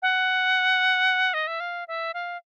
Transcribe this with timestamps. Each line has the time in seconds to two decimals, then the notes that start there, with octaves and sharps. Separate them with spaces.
0.02 F#5
1.34 D#5
1.47 E5
1.60 F5
1.88 E5
2.14 F5